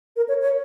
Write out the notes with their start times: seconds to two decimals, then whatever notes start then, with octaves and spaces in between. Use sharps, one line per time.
0.16 A#4
0.28 C#5
0.41 C#5